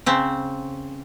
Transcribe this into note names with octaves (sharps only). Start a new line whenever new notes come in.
C#3 C4